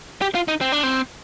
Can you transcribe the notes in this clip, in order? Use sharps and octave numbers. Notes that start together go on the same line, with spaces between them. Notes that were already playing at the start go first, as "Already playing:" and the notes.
G4
F4
D#4
C4
D4
C4